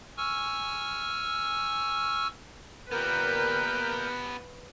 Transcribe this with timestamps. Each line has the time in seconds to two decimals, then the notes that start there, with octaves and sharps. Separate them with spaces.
0.17 G#5 C#6 E6 F6
2.91 A#2 B3 G4 A#4 B4 G6